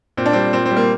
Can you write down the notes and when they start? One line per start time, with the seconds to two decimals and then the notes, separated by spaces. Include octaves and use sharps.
0.17 A#2 C4
0.26 D4
0.33 G3 C4
0.53 A#2 C4
0.66 C4
0.71 G3
0.77 A#3